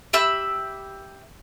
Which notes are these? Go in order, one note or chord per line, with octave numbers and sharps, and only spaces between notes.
G4 E5 B5 E6